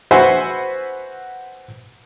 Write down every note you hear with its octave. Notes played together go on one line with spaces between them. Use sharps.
F#4 B4 C5 E5 F#5 G#5